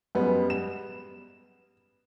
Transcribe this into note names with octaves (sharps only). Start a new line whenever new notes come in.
F#2 G3 G#3 B3
E7